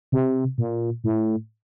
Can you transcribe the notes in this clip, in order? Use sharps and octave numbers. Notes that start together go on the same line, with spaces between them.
C3
A#2
A2